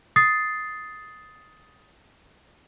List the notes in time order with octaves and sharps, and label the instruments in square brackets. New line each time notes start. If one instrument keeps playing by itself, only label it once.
[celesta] D#6 A6 C7